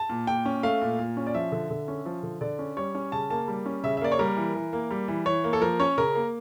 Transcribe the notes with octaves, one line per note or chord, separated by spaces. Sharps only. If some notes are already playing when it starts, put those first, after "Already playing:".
Already playing: A5
A#2
A#2 G5
C#4
A3 F5
A#2
A#2
C#4
D5
F3 E5
D3
D3
C#4
F3
D3
D3 D5
C#4
G3 C#5
C#4
C#3 A5
A#3 A5
G3
C#4
C#3 E5
E5
A#3 D5
C#5
G3 A#4
E3
E3
A#3
G3
E3
E3 C#5
A#3
A4
F3 A#4
C#4 C#5
C#3 A#4
A#3